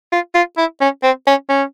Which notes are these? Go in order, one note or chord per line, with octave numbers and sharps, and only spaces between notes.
F4
F4
E4
C#4
C4
C#4
C#4